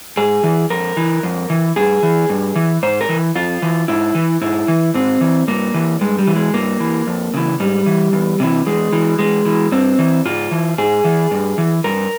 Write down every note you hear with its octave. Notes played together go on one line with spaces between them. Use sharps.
G#2 G#4
E3
F2 A#4
E3
F2
E3
G2 G#4
E3
G2
E3
G#2 C5
A#4
E3
F2 F4
E3
G#2 E4
E3
G#2 E4
E3
G#2 C4
E3
G2 A#3
E3
G2 G#3
G3
E3
G#3
G2 A#3
E3
F2
C#3 E3
G#2 G3
E3
E2
C3 E3
E2 G#3
E3
E2 G#3
E3
G2 C4
E3
G#2 F4
E3
G#2 G#4
E3
G2
E3
G2 A#4